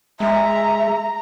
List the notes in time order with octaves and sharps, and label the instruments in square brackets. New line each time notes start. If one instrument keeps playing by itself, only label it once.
[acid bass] G#3 [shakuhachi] E5 [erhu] A#5